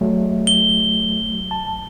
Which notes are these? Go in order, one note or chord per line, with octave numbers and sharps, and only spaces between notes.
F#3 A3
G7
A5